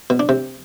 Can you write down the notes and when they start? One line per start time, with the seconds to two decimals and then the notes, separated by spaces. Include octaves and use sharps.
0.10 B2
0.20 D4
0.29 C3